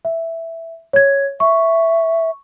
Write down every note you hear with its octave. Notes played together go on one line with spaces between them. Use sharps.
E5
C#5 G#6
E5 C#6